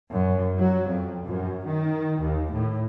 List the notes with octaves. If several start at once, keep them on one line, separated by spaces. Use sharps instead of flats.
F#2
F#3
F2
F#2
D#3
D#2
A2